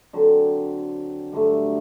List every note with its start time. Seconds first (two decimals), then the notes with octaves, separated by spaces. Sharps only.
0.13 D3 F#3 C4
1.33 G2 D3 F#3 A3